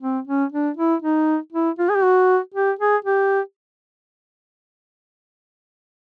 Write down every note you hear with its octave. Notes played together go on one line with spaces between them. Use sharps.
C4
C#4
D4
E4
D#4
E4
F4
G#4
G4
F#4
G4
G#4
G4